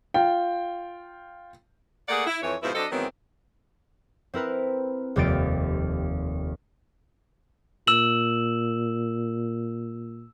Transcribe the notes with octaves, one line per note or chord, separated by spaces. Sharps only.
F4 G5
A3 A#3 G#4 D5 F#5
E4
F2 E3 C#5
G#2 B2 F3 E4 B4 C5
F#3 C4 D4 A4 D#5
G#2 D#3 E3 F#3 B3 C4
C4 E4 A#4 B4
F1 D#2 G3 F4 A6 D7
A#2 E6 E7 F#7